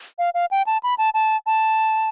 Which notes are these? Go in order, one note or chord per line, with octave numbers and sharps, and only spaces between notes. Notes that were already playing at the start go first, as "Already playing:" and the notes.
F5
F5
G5
A5
B5
A5
A5
A5